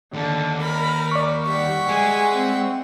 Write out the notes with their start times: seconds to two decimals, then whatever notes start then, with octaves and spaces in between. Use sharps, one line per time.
0.13 D#2 D3
0.62 A#4 B5
1.11 D5 C#6
1.48 G3 E5 F#5
1.88 G#3 D#5 G#5
2.31 C4